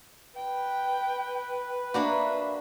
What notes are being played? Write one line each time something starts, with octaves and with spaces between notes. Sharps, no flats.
B4 G5
A#3 D4 F#4 E5 B5